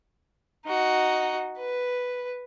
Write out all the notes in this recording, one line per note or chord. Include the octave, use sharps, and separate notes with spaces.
D#4 F#4
B4